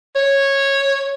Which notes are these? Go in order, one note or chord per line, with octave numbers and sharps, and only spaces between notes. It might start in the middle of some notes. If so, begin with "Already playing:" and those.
C#5